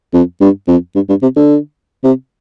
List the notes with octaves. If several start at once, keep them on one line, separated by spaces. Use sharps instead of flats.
F2
G2
F2
G2
G2
C3
D3
C3